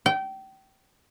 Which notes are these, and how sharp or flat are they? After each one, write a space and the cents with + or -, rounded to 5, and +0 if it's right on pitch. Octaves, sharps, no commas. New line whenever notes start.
G5 -25